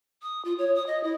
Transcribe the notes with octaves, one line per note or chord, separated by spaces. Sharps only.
D#6
F4
C#5
D#6
D#5
E4